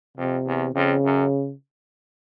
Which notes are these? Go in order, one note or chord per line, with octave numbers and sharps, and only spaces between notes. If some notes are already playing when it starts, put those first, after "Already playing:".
F2 C3
E2
F2 C#3
F#2